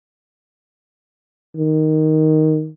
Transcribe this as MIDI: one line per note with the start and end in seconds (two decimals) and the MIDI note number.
1.57 2.69 51